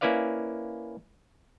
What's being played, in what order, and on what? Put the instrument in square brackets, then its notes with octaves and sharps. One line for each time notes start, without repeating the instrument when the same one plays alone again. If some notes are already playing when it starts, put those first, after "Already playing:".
[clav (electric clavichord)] A#3 C#4 E4 B4 D5 F5